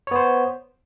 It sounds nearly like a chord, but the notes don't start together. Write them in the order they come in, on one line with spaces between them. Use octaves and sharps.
C#5 B3 C5